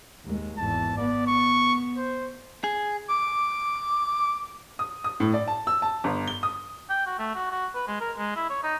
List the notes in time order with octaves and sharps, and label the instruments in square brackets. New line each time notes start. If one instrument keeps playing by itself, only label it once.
[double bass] D#2 G#3
[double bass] G#1 E2 [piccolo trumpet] A5
[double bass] B3 [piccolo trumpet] D5
[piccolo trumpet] C#6
C5
[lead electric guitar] G#4
[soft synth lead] D6
[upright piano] D#6
D#6
A2
D5
A5
E6
A5
G1
G7
D#6
[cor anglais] G5
F#4
A3
F#4
F#4
B4
G#3
A#4
G#3
E4
C#5
D#4